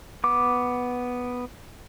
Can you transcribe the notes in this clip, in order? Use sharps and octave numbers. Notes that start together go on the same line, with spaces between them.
B3 D6